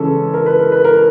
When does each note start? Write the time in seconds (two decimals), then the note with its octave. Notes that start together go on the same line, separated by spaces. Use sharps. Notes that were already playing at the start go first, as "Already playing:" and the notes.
Already playing: C#3 E3 G#3 C#4 A4
0.34 A#4
0.46 B4
0.59 A#4
0.72 B4
0.85 A#4